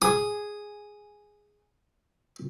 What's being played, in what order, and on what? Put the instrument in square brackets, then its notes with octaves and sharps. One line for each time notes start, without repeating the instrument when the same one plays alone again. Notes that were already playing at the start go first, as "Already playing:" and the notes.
[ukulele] G#4 [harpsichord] D#6